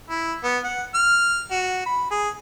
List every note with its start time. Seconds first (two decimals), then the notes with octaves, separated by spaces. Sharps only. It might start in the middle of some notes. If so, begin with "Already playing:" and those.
0.10 E4
0.44 B3
0.64 F#5
0.94 F6
1.51 F#4
1.86 B5
2.11 G#4